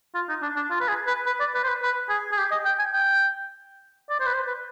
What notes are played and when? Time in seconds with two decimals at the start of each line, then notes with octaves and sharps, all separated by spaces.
0.15 F4
0.29 D#4
0.43 D4
0.56 D4
0.70 F4
0.81 B4
0.88 G#4
1.07 B4
1.26 B4
1.40 D5
1.55 B4
1.64 C5
1.68 B4
1.82 B4
2.09 G#4
2.32 G#4
2.38 G4
2.51 D#5
2.65 G5
2.79 G#5
2.94 G5
4.10 D5
4.20 C5
4.26 B4
4.34 C5
4.47 B4